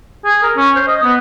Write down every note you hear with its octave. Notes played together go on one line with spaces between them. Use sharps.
G#4
A#4
C#4
C5
D#5
B3